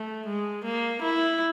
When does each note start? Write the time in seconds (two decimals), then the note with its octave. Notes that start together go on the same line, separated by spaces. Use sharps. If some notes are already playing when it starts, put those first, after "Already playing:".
Already playing: A3
0.26 G#3
0.64 A#3
1.02 E4